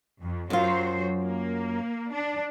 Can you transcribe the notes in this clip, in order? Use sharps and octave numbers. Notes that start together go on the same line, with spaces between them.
F2
F#2 F#3 F4 C5
A#3
D4